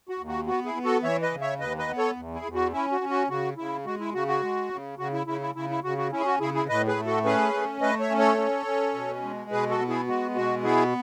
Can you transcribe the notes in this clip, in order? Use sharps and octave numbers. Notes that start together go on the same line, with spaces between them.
F#4
D#2
F#4
B3 F#4
E4 G#4
B3
F#4 A4
E3 C#5 E5
B4 D#5
C#3
C#5 E5
D#2 B4 D#5
B4 D#5
B3
A4 C#5
E2
E4 G#4
E2
F#4
C#4 E4
F#4
C#4
F#4
C#3 F#4
C#3 E4
G#3 F#4
E4
C#3 F#4
F#4
G#3
C#3
C#3 F#4
E4
C#3 E4
E4
C#3 E4
E4
C#3 F#4
F#4
C#4 E4
G#4
F#4
C#3 E4 G#4
E4 G#4
A2 B4 D#5
G#4 B4
A3
F#4 A4
C#4 G#4 B4
A3
A3 B4 D#5
C#5 E5
C#4
A4 C#5
C#4
C#4
B2
G#3
B2 G#4 B4
F#4 A4
B3
E4 G#4
G#3 F#4
B2 F#4
B3 E4 G#4